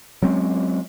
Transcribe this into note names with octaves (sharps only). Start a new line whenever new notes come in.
F#3 G#3 C4 C#4